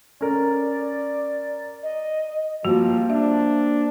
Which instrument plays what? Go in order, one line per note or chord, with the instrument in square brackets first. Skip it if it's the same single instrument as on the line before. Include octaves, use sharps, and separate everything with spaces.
[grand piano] C#4 A#4 [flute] D5
[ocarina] D#5
[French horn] F3 [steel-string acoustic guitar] G3 A#3 C4 [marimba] F#4
[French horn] D4 [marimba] E5